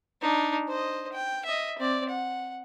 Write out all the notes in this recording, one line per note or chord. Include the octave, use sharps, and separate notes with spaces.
D4 D#4
C5 D#5
G5
D#5 E5
C4 D5
F#5